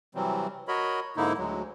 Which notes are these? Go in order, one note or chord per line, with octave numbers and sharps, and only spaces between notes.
C3 E3 F#3 G3 C4
F#4 A#4 C#5 D#5 B5
G#2 D3 A#3 D#4 E4
D2 F#3 G#3